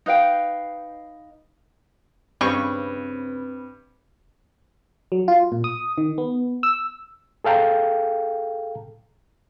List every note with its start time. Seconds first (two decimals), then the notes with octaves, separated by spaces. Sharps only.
0.06 D#4 B4 F5 G5
2.41 G2 C#3 C4 B4 C#6
5.12 F#3
5.28 F4
5.52 A#2
5.64 D#6
5.98 D#3
6.18 B3
6.63 E6
7.44 G#4 A4 F5 G5 A5 A#5